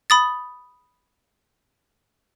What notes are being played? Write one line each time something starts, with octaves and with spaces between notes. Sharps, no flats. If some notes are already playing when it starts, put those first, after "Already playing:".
B5 D#6 A6